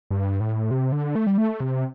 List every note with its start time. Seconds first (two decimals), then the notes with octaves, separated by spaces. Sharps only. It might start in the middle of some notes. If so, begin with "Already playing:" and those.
0.11 G2
0.40 A2
0.71 C3
0.92 D3
1.15 A3
1.27 G3
1.38 A3
1.60 C3